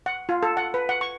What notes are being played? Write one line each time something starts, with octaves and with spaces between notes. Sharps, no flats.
F#5
F4
A4
F#5
B4
F#5
C#6